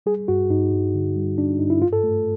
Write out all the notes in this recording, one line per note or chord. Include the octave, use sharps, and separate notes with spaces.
G3 G#4
G2 F#4
G2 D#4
G2
D3
G3
G2 D4
G2 D#4
E4
G#2 F4
A4
A3